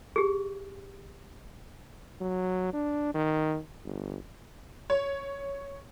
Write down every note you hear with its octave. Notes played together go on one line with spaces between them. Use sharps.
G4 G#4
F#3
D4
D#3
G1
C#5